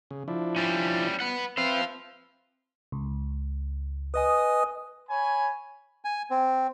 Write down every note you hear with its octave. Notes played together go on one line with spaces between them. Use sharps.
C#3
F3 D4 E4
G3 C#4
B4 F#5
C4 B4 C5 E5 F5
C#2
B4 D#5 G#5 D#6
C#5 G#5 B5
G#5
C4